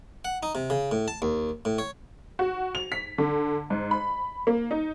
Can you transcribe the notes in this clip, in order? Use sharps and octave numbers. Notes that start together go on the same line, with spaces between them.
F#5
D#4
C3
C#3
A2
A5
D#2
A2
C#5
F#4
F7
B6
D3
G#2
B5
A#3
D#4